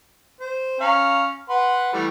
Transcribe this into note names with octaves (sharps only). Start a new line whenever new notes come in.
C5
C#4 F5 A#5
B4 F#5 C6
E3 G3 A3